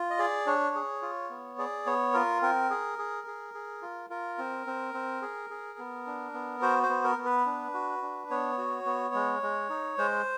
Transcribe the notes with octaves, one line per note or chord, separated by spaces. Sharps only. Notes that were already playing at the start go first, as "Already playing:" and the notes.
Already playing: F4
D#5
G#4 D5
D4 C#5
G#4
F4
B3
G#4 D5
B3 C#5
F4 A#4
C4 A#4
G#4
G#4
G#4
G#4
F4
F4 A#4
C4
C4
C4
G#4
G#4
B3
D4
B3
F#4 C5
C5
B3
A#4
B3
B4
D4
F#4
D4
B3 C#5
F#4
B3
G#3
G#3
D#4
G#3 C5